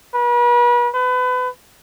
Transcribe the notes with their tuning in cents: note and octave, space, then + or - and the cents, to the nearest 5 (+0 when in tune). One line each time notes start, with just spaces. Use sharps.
B4 -40
B4 +30